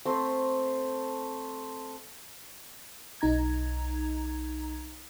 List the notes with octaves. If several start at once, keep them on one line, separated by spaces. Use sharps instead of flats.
A3 C4 A#5 C6
B1 D#4 A#5 G#6